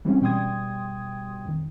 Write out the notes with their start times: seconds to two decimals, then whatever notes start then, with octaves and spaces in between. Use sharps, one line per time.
0.05 E3 G3 G#3 C4 C#4
0.21 B2 G3 G5 C6 D#6 G#6
1.45 F2 D#3